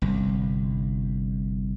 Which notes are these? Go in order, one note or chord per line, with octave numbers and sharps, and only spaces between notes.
G1 C2